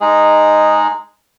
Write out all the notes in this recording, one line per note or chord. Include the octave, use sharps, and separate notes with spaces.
G#3 D#4 G#4